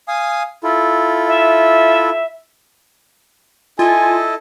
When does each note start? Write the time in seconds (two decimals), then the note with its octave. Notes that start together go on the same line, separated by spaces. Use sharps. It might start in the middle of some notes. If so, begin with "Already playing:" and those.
0.08 F5 G#5 D#6
0.64 E4 F4 A4
1.28 E5
3.79 E4 F4 A4 D#5 G#5